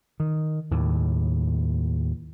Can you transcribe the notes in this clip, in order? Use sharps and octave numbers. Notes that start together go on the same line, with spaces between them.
D#3
D#2 A2